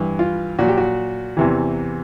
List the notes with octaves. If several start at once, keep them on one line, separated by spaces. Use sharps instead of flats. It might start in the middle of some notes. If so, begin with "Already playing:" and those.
Already playing: G2 E3
F4
A#2 F#3 F#4
G4
F#4
E2 C3 E3